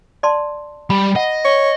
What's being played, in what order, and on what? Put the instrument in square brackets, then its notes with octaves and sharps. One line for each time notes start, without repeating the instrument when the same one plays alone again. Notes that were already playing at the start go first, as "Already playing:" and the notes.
[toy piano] D5 A5 C6
[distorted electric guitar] G3 [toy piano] B5
[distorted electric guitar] D#5 [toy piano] F#5
[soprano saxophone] C#5